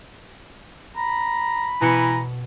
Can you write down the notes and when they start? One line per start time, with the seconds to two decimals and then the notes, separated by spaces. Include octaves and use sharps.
0.96 A#5 B5
1.81 B2 E3 A#5 C#7 D#7